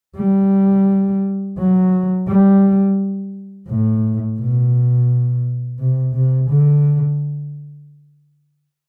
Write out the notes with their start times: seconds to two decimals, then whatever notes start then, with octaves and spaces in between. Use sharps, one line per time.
0.17 G3
1.58 F#3
2.28 G3
3.69 A2
4.40 B2
5.80 C3
6.15 C3
6.50 D3